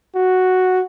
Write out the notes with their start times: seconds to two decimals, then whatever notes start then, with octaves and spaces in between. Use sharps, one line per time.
0.15 F#4